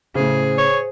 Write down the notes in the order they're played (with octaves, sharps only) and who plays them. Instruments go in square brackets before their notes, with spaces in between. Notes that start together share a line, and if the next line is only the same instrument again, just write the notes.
[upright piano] A2 C#3 [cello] G#4 [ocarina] C5
[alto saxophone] C#5